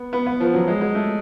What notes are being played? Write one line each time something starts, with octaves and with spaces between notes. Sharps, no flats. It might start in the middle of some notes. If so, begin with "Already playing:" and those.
Already playing: B3
B3
B3
F3
F#3
G#3
G#3
A3